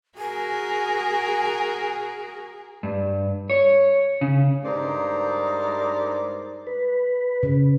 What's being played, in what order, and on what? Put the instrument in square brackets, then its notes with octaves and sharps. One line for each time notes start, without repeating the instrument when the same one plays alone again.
[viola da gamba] F#4 A#4 [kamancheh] G#4 [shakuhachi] G#5
[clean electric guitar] G2
C#5
C#3
[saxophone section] G2 G#3 D#4 A#4 C5 D5
[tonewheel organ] B4
[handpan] C#3